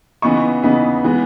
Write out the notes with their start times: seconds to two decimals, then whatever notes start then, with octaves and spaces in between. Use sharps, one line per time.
0.22 C#3 E3 B3 D#4 C#6
0.63 C#3 E3 B3 D#4
1.04 E3 G#3 B3